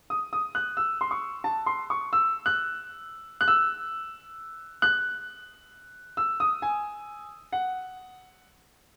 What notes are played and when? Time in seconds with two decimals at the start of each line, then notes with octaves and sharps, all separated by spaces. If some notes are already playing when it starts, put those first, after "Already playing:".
0.10 D#6
0.33 D#6
0.55 F#6
0.77 E6
1.01 C6
1.11 C#6
1.44 A5
1.66 C6
1.90 C#6
2.13 E6
2.46 F#6
3.41 F#6
3.48 E6
4.82 F#6
6.17 E6
6.40 D#6
6.62 G#5
7.52 F#5